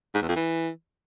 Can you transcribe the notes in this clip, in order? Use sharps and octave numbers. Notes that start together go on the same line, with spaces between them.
G#2
E2
F2
E3